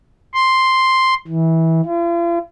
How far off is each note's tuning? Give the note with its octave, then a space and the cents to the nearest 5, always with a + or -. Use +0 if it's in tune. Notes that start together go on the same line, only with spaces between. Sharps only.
C6 +0
E3 -20
F4 -45